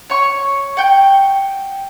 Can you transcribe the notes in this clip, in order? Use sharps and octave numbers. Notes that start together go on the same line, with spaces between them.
C#5 C#6
F#5 G5 G6